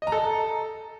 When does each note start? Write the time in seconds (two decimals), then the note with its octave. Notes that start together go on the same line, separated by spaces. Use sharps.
0.02 D#5
0.07 A#5
0.12 A4